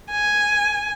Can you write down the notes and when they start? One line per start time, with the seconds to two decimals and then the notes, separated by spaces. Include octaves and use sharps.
0.11 G#5